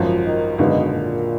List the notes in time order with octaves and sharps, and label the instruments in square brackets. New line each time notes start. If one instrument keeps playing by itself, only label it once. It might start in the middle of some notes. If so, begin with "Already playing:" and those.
Already playing: [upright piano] G#1 F#2 F3
[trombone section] D#3
[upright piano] G#1 F#2 D3 G#3 D#4 [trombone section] B2
[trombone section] A#2